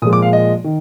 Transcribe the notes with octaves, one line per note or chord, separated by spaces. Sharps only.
A#2 F3 G#3 D#6
D6
F5
D#5
D#3